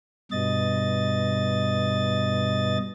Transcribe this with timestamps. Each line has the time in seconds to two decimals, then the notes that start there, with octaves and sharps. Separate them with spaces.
0.32 G2 B2 D#5 A6